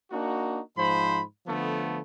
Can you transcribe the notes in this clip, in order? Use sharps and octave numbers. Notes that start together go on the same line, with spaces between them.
A#3 D4 D#4 F#4
G#2 F3 C5 B5
D3 F3 A3 B3